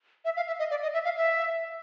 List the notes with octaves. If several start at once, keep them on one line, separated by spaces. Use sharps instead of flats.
E5
F5
E5
D#5
D5
D#5
E5
F5
E5